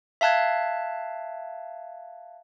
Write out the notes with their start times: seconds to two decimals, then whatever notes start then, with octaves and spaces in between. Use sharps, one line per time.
0.21 E5 F5 A5 F#6 G#6